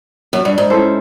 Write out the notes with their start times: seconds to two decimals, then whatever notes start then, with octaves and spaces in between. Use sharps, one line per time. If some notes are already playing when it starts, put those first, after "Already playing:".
0.33 F#2
0.45 G2
0.58 G#2
0.70 C#4 E4 A4 C5